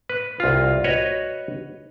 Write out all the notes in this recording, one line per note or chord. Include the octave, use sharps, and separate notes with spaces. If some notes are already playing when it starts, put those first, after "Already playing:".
B4
C2 F4
F#4 B4 C#5 D#5